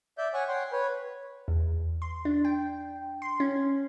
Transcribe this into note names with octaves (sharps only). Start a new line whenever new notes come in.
D5 E5 G6
C#5 F#5 G#5 C#6
C#5 F#5 G5 C6
B4 C#5
E2
C6
D4
G5
C6
C#4